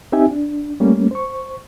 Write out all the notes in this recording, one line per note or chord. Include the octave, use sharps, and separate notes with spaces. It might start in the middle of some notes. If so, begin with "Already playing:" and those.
C4 D#4 G4 E5 G#5
D4
G3 A3 A#3 C#4
C5 C#6